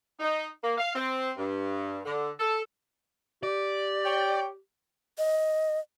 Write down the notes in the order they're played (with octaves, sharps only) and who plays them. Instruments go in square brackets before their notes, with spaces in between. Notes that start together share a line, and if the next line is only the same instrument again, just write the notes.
[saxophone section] D#4
A#3
F5
C4
G2
D3
A4
[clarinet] G4 [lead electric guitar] D5
[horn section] C#5 G5
[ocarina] D#5